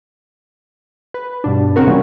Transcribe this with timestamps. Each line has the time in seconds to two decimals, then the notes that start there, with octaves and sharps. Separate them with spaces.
1.14 B4
1.44 G2 B2 D4
1.76 C#3 C4 F#4 A#4
1.87 C3 E3 F3 G3 A#3 C#4